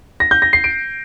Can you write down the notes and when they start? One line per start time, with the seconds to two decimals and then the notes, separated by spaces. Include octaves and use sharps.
0.20 A#6
0.31 G6
0.42 A#6
0.53 C7
0.64 D7